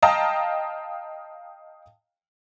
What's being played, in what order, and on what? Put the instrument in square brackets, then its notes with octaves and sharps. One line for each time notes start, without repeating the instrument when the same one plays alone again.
[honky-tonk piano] D#5 F5 G5 A5 A#5